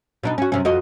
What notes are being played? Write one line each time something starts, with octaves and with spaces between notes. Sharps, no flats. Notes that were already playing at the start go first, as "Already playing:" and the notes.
B2 D4 D#4
C#4 F#4
F#2 C3 C#4
F2 F#4 D#5